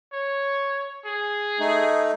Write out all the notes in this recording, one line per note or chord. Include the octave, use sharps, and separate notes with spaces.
C#5
G#4
A3 D#4